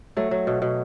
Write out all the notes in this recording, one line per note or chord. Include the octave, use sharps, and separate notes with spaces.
F#3 A3
F#3
B2
B2